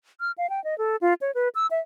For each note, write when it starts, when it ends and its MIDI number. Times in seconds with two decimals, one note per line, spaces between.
0.20 0.32 89
0.38 0.50 77
0.50 0.63 79
0.64 0.77 75
0.78 0.96 69
1.01 1.14 65
1.21 1.31 73
1.35 1.49 71
1.55 1.67 88
1.71 1.80 76